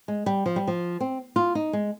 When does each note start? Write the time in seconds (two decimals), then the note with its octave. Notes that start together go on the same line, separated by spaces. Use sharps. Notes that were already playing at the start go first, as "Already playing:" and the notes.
0.08 G#3
0.26 G3
0.46 F3
0.56 G3
0.68 F3
1.00 C4
1.36 F4
1.55 D#4
1.73 G#3